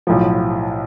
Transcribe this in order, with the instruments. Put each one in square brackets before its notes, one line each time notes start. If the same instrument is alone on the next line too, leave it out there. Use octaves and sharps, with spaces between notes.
[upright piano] B1 A2 F3